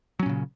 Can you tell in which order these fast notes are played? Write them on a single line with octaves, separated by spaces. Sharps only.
F#3 C#4 A#2 C#3